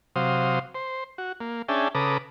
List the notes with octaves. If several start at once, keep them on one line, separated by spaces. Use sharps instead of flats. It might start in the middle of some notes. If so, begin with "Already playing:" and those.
C3 F#3 C5 F5 D#6
C5
F#4
A#3
C#4 D4 G#4 E5 G5 A5
C#3 A4 B4 A#5 D6 D#6